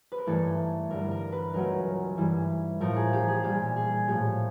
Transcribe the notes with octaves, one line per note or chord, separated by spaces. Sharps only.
B4
A#4
G2 E3 A3 A4
G2 D3 G3 A#4
A#4
B4
C#2 C#3 F#3 A3 A#4
G2 E3 G3
A2 F3 A3 A#4
G#4
G4
G#4
A#2 G3 G4
G#4
A2 F3 A3 G4